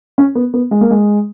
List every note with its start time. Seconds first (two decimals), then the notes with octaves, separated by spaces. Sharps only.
0.18 C#4
0.35 B3
0.54 B3
0.71 G#3
0.81 A#3
0.91 G#3